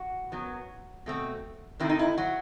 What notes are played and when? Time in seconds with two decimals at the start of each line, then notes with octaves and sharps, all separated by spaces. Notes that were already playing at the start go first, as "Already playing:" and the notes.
Already playing: F#4
0.32 F#2 F#3 B3
1.06 B2 A3 C4
1.80 C3 D#3 A3 C4 E4
1.90 D#4
1.99 E4
2.18 F#3 F#4